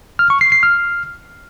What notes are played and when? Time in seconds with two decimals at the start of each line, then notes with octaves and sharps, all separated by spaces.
0.19 F6
0.30 C#6
0.41 C7
0.52 C7
0.63 F6